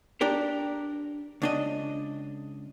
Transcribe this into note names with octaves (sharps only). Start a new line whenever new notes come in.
D4 G4 A#4
C#2 D4 D#5